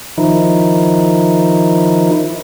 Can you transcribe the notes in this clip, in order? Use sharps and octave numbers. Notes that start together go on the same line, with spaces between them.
D#3 F3 D#4 E4